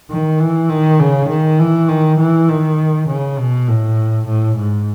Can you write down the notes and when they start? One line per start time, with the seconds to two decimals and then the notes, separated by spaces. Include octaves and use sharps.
0.11 D#3
0.40 E3
0.69 D#3
1.00 C#3
1.29 D#3
1.59 E3
1.88 D#3
2.19 E3
2.49 D#3
3.08 C#3
3.39 B2
3.68 A2
4.27 A2
4.57 G#2